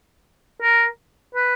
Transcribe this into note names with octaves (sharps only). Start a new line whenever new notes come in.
A#4
B4